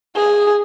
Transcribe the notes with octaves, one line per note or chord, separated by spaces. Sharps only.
G#4